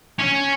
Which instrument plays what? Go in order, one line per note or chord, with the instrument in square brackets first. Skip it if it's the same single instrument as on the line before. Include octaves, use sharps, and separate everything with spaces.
[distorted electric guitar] C#4